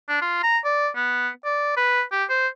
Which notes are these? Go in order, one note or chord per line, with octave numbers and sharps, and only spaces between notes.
D4
F4
A#5
D5
B3
D5
B4
G4
C5